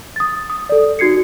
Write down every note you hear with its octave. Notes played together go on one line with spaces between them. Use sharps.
D#6 A6
D#6
A4 D5
D#4 F#4 G#6 C7 C#7